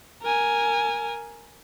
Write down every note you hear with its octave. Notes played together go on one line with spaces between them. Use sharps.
A#4 G#5